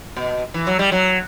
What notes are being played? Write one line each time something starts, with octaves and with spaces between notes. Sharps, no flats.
B2
E3
F#3
G3
F#3